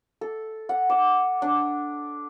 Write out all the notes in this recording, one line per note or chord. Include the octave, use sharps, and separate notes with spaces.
A4
F#5
D6
D4